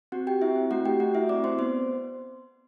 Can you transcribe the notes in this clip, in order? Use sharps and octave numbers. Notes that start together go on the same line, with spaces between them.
C4 F#4 F#5
G4 G5
C4 E4 E5
C4
A3 F#4 F#5
A3 G4 G5
A3 F#4 F#5
A3 E4 E5
C4 D5 D6
C4 C5 C6
B3 C5 C6